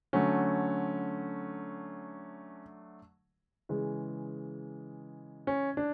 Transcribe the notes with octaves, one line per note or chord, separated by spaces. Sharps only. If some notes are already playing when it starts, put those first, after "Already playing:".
D3 F#3 A3 C#4
C#3 E3 G#3
C#4
D4